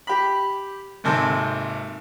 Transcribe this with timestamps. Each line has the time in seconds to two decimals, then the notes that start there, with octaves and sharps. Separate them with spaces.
0.07 G4 B5
1.04 G#1 D#2 C3 A4